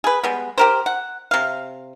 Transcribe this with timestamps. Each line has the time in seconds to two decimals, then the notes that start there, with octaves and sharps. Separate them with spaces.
0.04 G#4 B4
0.24 G3 G#3 B3
0.58 G4 A#4 C5
0.86 F#5
1.31 C3 F5